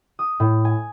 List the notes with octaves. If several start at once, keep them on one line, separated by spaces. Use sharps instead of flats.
D#6
A2
G#5